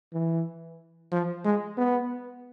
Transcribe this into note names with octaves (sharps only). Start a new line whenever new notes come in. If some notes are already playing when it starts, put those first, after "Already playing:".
E3
F3
G#3
B3